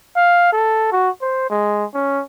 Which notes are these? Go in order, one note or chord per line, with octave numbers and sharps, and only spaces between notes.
F5
A4
F#4
C5
G#3
C#4